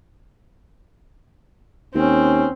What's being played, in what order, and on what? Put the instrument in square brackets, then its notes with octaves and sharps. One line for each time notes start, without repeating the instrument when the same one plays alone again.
[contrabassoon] D#2 [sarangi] C4 [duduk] C#4